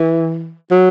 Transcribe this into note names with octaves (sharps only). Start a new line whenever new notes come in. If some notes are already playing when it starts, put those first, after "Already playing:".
Already playing: E3
F#3